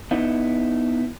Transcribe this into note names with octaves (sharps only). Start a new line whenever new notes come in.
B3 D#4 E4